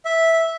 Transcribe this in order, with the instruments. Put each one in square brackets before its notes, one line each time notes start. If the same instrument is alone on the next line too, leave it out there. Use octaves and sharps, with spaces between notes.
[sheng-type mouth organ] E5